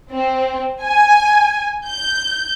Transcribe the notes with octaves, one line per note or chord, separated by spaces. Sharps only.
C4
G#5
G6